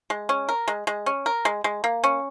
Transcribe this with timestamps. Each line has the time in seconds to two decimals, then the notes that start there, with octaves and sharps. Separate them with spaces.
0.10 G#3
0.29 C#4
0.49 A#4
0.68 G#3
0.87 G#3
1.06 C#4
1.26 A#4
1.45 G#3
1.64 G#3
1.84 A#3
2.04 C#4